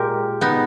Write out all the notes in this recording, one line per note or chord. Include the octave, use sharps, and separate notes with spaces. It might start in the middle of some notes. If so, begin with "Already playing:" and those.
Already playing: A#2 G#3 G4 A#4
B3 D#4